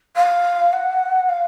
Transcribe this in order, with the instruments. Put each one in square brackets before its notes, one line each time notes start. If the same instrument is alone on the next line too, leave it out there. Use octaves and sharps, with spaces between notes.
[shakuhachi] F5
F#5
F5